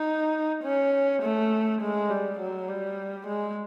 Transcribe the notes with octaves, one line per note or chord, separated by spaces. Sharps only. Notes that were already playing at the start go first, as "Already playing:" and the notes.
Already playing: D#4
C#4
A3
G#3
G3
F#3
G3
G#3